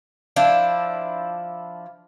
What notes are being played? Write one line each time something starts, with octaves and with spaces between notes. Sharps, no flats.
F3 D4 E4